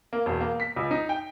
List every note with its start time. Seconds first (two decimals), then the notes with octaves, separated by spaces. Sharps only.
0.13 A#3
0.26 E1
0.41 A#3
0.60 B6
0.76 C#2
0.91 D#4
1.09 G5